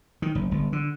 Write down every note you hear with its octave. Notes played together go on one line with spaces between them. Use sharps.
D#3
F#1
G1
D3